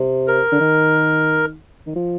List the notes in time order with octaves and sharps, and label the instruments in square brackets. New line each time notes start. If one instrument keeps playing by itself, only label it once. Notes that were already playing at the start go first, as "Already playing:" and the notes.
Already playing: [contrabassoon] C3
[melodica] A#4
[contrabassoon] D3
D#3
D#3
F3